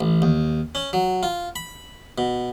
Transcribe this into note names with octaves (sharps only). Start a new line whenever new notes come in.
A1
D#2
C#4
F#3
F4
B5
B2